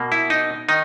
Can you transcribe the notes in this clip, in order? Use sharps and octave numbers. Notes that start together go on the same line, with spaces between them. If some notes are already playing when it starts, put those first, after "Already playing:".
Already playing: B2 A#3
E4
D#4
D#3 D#4